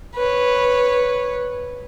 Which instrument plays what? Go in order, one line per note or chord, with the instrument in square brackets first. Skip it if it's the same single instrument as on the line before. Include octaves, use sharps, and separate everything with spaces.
[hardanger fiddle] B4 C#5